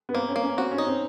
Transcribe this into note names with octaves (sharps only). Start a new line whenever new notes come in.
B3
A#3 C4
C#4
A#3
C#4
C4 F#4
C#4
D#4
C4